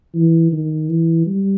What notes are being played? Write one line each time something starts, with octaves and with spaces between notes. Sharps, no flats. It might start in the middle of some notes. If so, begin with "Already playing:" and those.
E3
D#3
E3
G3